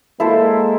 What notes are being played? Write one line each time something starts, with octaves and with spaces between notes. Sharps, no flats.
G#3 A#3 E4 A4 C5